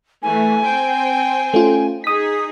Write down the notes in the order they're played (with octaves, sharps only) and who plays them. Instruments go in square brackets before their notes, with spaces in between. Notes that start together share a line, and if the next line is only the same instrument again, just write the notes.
[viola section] E3 A3 [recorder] G#5
[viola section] C4 C5 G5
[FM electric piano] A3 C#4 F4
[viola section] D#4 G#4 [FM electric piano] D#6 B6